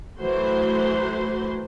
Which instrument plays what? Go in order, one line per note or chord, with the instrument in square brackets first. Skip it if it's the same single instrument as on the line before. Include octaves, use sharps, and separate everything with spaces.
[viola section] E3 F#3 A3 F#4 C5 C6